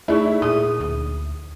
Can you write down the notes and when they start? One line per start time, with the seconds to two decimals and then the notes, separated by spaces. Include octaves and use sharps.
0.08 A3 D#4 E4 G#4 D5
0.42 A#2 G#4 D#6
0.80 D2